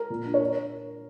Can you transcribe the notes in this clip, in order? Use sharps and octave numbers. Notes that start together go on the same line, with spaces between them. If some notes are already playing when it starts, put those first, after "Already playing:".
Already playing: A#4
A#2
D4
C#5
A#4